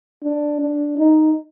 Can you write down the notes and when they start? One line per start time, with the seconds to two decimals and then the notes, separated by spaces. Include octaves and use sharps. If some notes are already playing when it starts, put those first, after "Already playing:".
0.24 D4
0.61 D4
0.98 D#4